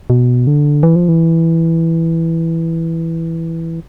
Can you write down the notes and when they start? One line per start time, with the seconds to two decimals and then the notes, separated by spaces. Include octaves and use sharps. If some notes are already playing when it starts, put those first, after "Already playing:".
0.10 B2
0.47 D3
0.83 E3
0.96 F3
1.09 E3